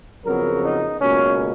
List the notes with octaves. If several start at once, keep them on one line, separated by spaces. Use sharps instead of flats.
F2 C#3 F#3 B3 A#4
D#4
C#2 B2 A#3 C#4